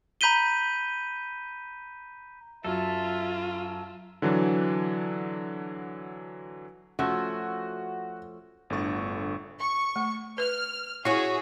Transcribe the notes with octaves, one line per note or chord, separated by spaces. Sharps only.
A#5 B5 G6 B6 D#7 G7
F#2 F4 A4 E5
D3 E3 F#3 D4
F3 A3 C#4 F#4
G1 A2 D3 C#6 A6
C#6
A3
B4 F6
C#4 E4 F#4 G#4 E5